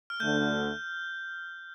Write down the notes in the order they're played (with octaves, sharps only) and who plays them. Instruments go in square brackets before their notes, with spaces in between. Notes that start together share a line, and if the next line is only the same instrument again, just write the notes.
[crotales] F6
[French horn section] D2 D3 A3 [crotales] G6